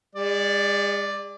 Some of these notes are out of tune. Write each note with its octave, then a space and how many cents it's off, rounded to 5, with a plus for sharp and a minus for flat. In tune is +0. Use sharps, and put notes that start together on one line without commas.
G#3 -40 D5 +0